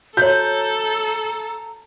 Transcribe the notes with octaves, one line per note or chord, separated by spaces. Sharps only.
F#4 A4 C#5 A#5 G6